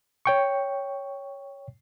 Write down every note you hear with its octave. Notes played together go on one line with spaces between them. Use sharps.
C#5 G5 C#6